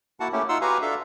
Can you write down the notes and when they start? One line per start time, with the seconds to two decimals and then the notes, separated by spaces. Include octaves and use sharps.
0.20 A#3 E4 F#4 F#5 A5
0.32 A3 A#3 C#4 E4 G4
0.49 D#4 F4 F#5 C6 E6
0.61 F#4 G4 B4 F5 G#5 A#5
0.82 D4 A4 E5 F5